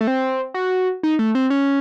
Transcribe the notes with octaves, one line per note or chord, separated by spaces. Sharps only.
A3
C4
F#4
D#4
A3
C4
C#4